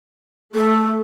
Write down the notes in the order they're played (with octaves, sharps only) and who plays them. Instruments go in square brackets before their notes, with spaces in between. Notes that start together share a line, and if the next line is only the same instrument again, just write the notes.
[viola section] A3 [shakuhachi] A4